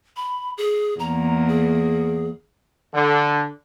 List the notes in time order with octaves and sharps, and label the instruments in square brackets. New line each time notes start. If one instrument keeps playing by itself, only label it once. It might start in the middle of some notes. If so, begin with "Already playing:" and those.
[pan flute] B5
G#4
[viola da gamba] E2 A#3 [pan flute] A#5
[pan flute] G#4
[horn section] D3